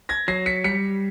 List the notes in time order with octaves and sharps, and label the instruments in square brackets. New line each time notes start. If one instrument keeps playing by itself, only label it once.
[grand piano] G#6 A#6
[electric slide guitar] F#3 [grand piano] A#6 C7
[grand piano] B6 C#7
[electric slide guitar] G3 [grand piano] B6 C#7